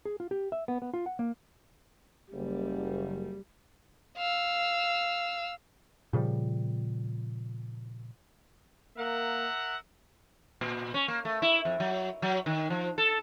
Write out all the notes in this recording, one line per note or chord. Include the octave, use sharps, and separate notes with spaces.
G#4
F4
G4
E5
B3
B3
F4
F#5
A#3
F#1 G3
F5 E6
A#2 C#3 F3 G3
A#3 A#4 E5 F#5
A#2
C#4
A#3
A3
E4
F2
F#3
F#3
D#3
F3
A4